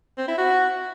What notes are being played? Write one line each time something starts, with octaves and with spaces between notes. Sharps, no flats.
C4
E4
F#4